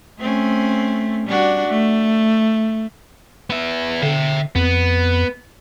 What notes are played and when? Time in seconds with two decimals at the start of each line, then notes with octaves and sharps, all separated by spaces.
0.19 A3 C4 C#4
1.27 G3 D4 F#4
1.68 A3
3.50 B3 E5
4.03 D3 E5 G5
4.55 F2 B3